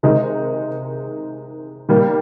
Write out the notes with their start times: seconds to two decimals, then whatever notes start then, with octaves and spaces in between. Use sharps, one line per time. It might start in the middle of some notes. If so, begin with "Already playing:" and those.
0.03 C3 D#3 G#3 D#4
1.89 D#3 G3 A#3